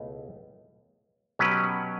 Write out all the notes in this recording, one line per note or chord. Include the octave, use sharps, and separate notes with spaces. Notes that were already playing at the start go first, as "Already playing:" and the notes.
Already playing: C#2 B2 A3 E4
B2 F#3 C#4 G4 B4